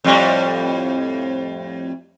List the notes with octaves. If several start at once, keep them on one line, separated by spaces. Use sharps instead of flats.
F2 A2 G3